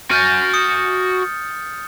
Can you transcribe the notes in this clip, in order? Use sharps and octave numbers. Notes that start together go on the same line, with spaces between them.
F#4 G#5 F6 G6 A6
D#6 C#7